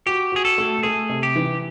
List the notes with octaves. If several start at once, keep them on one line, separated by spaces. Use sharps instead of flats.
F#4 G4
F#4 G#4
A4
A3
A3 G#4
C3
G4
E3